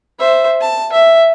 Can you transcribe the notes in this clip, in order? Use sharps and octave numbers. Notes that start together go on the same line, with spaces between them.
C5 E5
A5
E5